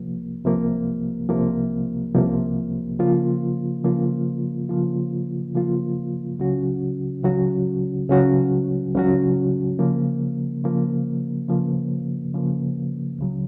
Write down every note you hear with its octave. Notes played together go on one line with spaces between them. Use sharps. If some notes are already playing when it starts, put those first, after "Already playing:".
Already playing: C2 C3 F3 A#3
C2 C3 F3 A#3
C2 C3 F3 A#3
C2 C3 F3 A#3
C#3 F3 A#3 F4
C#3 F3 A#3 F4
C#3 F3 A#3 F4
C#3 F3 A#3 F4
C#2 C#3 F#3 C#4 F#4
C#2 C#3 F#3 C#4 F#4
C#2 C#3 F#3 C#4 F#4
C#2 C#3 F#3 C#4 F#4
C#3 F3 A#3
C#3 F3 A#3
C#3 F3 A#3
C#3 F3 A#3
C#2 C#3 F#3